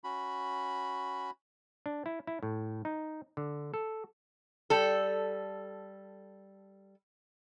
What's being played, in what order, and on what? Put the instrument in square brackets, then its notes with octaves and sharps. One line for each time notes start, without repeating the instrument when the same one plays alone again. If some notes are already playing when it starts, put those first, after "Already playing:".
[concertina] C#4 F#4 B5
[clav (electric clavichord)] D4
E4
E4
A2
D#4
D3
A4
[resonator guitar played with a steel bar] G3 A4